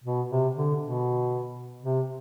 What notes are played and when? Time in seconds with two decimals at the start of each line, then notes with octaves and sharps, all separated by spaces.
0.04 B2
0.29 C3
0.55 D3
0.81 B2
1.83 C3